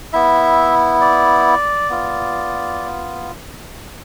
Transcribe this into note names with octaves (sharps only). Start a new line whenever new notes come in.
B3 E4 E5
D5
B3 F4